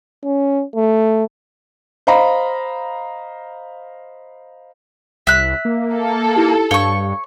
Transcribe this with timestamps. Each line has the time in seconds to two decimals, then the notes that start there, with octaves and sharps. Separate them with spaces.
0.25 C#4
0.76 A3
2.07 C5 D#5 F5 A#5 B5
5.27 C2 E5 F#6
5.65 A#3
5.94 A4
6.36 D#4 E4 G4
6.71 G2 C#5 F5 C#6 G6 G7